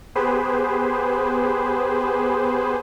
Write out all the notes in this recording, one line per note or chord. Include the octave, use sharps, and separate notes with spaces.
B3 G4 G#4 B4 C5